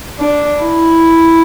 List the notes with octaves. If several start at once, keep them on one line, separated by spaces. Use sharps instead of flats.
D4
E4